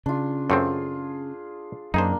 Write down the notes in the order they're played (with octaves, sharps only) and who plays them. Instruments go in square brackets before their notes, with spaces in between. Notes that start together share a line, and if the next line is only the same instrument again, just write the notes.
[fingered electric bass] C#3 [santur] D4 F4
[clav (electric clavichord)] F#2 A3 C4 [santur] F4 G#4 D5
[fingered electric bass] F#2 [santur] A#3 D4 [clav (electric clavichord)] D#4 G#4 C5